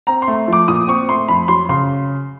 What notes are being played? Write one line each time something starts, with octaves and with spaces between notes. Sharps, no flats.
C4 A#5
C6
A3
F3 D6
A#2 D#6
C4 C#6
A3 C6
F2 B5
F#3 C6
C#3 C6